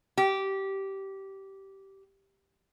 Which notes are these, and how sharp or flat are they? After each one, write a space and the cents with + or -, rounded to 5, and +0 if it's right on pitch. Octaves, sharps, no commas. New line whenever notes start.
G4 -15